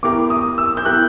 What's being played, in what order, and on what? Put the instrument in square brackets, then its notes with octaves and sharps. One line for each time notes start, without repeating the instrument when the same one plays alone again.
[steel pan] B3 E4 G4 A#4 [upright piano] D6
[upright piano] D#6
E6
G6
[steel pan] B3 E4 G4 A#4 [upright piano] F#6